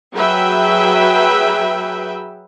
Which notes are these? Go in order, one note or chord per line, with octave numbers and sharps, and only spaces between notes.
F#3 G#4 B4 E5 G5